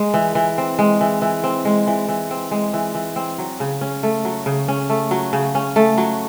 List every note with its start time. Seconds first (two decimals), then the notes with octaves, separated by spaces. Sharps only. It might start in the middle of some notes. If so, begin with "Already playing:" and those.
Already playing: G#3
0.14 E3
0.35 E3
0.58 C4
0.79 G#3
1.01 E3
1.22 E3
1.44 C4
1.65 G#3
1.87 E3
2.09 E3
2.31 C4
2.51 G#3
2.73 E3
2.95 E3
3.16 C4
3.38 F#3
3.60 C#3
3.81 C#4
4.03 A3
4.25 F#3
4.46 C#3
4.68 C#4
4.90 A3
5.11 F#3
5.33 C#3
5.55 C#4
5.76 A3
5.98 F#3